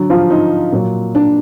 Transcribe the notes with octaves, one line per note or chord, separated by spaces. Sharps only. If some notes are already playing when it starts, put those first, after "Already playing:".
Already playing: D3 F#3
F3 F4
D#4
A#2 F#3
D4